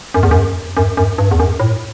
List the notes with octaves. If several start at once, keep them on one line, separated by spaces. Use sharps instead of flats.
F#2
E2
F#2
F#2
F#2
G2
E2
F#2
A2